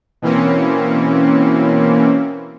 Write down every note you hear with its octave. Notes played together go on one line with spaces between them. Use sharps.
B2 E3 A#3 C4 C#4